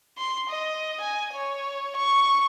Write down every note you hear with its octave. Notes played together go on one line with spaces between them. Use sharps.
C6
D#5
G#5
C#5
C#6